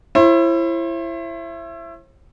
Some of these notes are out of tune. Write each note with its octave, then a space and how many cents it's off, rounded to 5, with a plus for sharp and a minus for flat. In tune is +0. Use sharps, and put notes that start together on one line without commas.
E4 +25 C5 +45